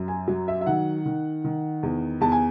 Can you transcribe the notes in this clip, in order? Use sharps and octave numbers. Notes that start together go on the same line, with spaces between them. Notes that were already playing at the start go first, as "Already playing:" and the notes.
Already playing: F#2
G#5
F#3
E5
E5
D#3 F#5
D#3
D#3
E2
E2 A5
G#5